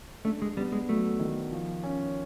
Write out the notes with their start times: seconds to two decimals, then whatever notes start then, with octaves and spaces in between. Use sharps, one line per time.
0.25 A3 D4
0.42 G#3
0.57 G3 B3
0.72 G#3
0.88 F#3 A3
1.19 D#3
1.52 F3
1.83 C#4